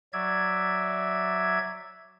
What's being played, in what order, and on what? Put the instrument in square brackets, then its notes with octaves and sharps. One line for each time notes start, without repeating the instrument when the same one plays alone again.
[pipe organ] F#3 D5 E5 G#6